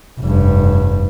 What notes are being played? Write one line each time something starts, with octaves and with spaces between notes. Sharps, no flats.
F1 G2